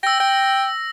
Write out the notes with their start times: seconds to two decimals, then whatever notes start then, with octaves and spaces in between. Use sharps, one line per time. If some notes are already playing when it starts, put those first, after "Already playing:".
0.03 G5 E6 A#6
0.20 G5